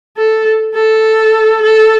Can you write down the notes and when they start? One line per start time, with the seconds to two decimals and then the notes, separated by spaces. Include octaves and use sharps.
0.18 A4
0.75 A4
1.63 A4